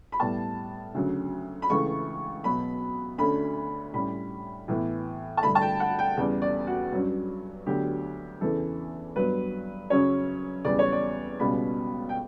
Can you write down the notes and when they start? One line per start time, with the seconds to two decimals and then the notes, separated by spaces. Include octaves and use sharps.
0.12 B5
0.19 A2 G3 B3 A5
0.95 D2 C#3 F#3
1.62 B5
1.70 C#2 C#3 E3 A3 C#6
2.43 B2 F#3 B3 B5
3.18 D2 D3 A3 C#4 B5
3.93 A2 G3 C#4 B5
4.68 A2 E3 B3
5.37 A5
5.42 G2 D3 A3 B5
5.55 A5
5.62 G5
5.80 F#5
5.99 G5
6.17 E2 C#3 G3
6.42 D5
6.67 F#4
6.92 G2 F#3 C#4
7.66 D2 D3 F#3 B3 G4
8.41 E2 C#3 E3 A4
9.16 G2 F#3 B3 B4
9.90 F#2 C#3 F#3 C#4 C#5
10.65 E2 C#3 G3 D5
10.79 C#5
10.92 D5
11.40 C#2 B2 G3 C#4 B5
12.09 G5